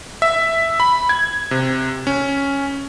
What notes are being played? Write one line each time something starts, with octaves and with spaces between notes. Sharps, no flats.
E5
B5
G#6
C3
C#4